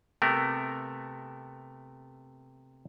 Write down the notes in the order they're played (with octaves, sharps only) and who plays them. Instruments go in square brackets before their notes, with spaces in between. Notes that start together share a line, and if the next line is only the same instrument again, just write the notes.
[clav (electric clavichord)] C3 A3 B3 A#4